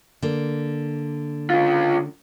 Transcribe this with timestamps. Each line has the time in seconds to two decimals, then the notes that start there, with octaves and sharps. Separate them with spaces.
0.22 D3 A#3
1.50 C#3 F4